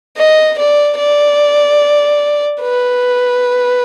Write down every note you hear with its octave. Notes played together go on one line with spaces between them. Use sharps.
D#5
D5
D5
B4